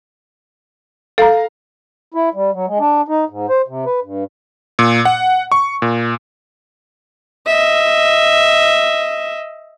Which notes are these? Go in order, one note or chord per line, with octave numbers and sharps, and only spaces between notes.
A4 F5 A#5
E4
G3
F#3
G#3
D4
D#4
G#2
C5
C3
B4
G2
A#2
F#5
C#6
A#2
D#5 E5